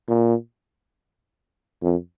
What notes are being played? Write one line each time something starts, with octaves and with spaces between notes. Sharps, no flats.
A#2
F2